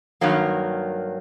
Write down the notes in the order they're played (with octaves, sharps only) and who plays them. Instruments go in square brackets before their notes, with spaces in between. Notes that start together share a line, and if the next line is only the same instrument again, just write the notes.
[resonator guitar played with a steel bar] G2 D#3 F#3 A#3